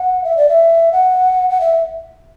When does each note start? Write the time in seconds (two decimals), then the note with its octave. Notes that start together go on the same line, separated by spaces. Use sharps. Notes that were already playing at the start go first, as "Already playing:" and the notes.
Already playing: F#5
0.24 E5
0.37 D5
0.49 E5
0.92 F#5
1.50 F#5
1.61 E5